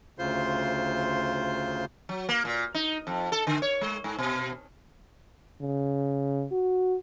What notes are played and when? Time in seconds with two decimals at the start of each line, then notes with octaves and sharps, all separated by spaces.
0.19 D2 C#3 F4 C5 C6
2.09 F#3
2.29 A#3
2.45 A#2
2.75 D#4
3.07 F2
3.32 A4
3.47 D3
3.62 C#5
3.81 G#3
4.04 G#2
4.18 B2
5.61 C#3
6.51 F#4